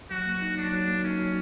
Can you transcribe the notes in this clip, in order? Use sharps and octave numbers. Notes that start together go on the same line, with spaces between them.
F#3 F#4
A#3
D#4
F#3 D4
F#3
A#3
C#4 D#4
F#3